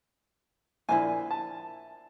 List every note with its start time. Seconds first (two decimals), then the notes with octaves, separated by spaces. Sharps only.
0.89 A#1 A#2 E4 C5 G#5
1.31 A5